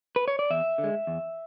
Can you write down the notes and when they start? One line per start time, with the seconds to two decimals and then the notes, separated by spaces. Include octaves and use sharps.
0.16 B4
0.28 C#5
0.39 D5
0.50 E2 E5
0.78 D3
0.84 G#3
1.07 E2